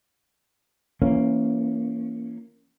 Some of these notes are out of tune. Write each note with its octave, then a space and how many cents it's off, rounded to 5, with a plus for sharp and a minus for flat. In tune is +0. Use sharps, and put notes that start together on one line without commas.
E3 +20 A#3 +0 C#4 -10